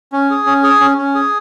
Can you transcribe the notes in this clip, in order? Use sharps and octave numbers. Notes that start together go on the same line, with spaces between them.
C#4
G#4
C#4
G#4
C#4
C#4
G#4